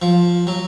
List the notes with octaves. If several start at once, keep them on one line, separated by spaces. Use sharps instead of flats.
F3
F#3